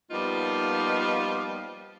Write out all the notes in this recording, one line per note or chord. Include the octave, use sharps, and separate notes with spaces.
F3 G3 A#3 B3 D#4 F4